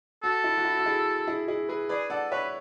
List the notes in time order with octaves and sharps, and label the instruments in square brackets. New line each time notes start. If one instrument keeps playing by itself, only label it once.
[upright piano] F#4 [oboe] A4
[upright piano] E4
F#4
E4
F#4
E4 G#4
E4 G#4
E4 G#4
G#4 B4
[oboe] G#4 [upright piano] B4 D5
[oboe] A4 [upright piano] D5 F#5
[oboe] B4 [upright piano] C#5 E5